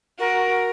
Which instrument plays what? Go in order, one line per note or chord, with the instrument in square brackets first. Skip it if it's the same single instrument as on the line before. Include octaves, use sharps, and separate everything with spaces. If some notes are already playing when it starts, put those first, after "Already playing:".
[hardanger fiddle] F#4 [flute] A#4